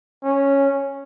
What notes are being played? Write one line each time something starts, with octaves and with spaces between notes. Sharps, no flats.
C#4